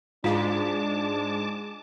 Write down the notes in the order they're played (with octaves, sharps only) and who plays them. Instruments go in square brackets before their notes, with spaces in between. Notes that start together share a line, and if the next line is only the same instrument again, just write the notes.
[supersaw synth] G#2 G#3 [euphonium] D4 [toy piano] F4 F5 [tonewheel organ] A5 D6